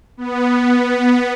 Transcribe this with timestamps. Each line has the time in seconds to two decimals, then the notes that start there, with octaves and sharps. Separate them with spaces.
0.17 B3